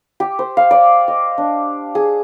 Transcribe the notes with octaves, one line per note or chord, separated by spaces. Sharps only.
G4
C5
F5
D5
D#5
D4
G#4